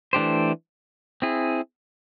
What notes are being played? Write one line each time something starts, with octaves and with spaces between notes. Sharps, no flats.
E3 A3 D4 G4 C5
C4 E4 G#4